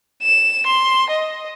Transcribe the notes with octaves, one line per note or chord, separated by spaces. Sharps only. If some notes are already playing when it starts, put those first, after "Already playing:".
E7
C6
D#5